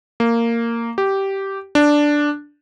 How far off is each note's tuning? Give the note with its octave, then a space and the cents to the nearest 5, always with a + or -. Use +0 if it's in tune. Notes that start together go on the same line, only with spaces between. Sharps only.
A#3 -10
G4 -10
D4 +0